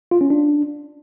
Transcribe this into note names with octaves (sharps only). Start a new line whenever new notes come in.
F4
C#4
D4